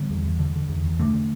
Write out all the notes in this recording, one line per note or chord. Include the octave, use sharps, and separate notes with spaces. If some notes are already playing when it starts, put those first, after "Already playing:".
Already playing: D3 G3 B3
E2
E2
D3
D3
E2
E2
D3 A3 D4
D3